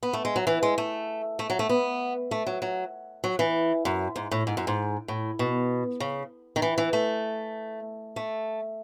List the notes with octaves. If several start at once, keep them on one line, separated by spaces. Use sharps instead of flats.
B3
A3
G#3
F#3
E3
G#3
A3
A3
F#3
A3
B3
A3
F#3
F#3
F#3
E3
F#2
G#2
A2
G#2
F#2
G#2
A2
B2
C#3
D#3
E3
E3
A3
A3